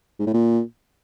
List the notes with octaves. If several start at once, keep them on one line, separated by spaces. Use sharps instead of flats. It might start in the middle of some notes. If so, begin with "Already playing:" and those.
G#2
A2
A#2